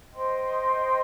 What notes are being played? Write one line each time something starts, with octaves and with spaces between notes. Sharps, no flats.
C5 D#5 G5 C6